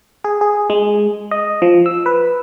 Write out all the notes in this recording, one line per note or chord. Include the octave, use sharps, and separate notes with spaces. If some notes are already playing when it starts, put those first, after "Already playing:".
G#4
G#4
G#3
D#5
F3
E6
B4